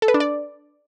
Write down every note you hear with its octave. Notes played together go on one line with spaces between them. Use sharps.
A4
B4
D4
D5